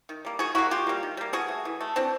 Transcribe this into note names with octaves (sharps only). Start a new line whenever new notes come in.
D#3
G3 A#3
D#3 F#4 G#4
G3 A#3 E4 F#4
D#3 F4 G4
G3 A#3
D#3
G3 A#3
E3 F#4 G#4
A3
E3
A3
E3 C4 D4